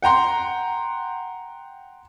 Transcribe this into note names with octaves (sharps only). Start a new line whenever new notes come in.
F#5 G5 A#5 C6